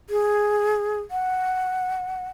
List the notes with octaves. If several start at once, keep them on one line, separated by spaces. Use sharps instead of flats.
G#4
F#5